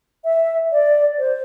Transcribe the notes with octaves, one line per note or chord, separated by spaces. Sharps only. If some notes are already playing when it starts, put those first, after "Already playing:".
E5
D5
C5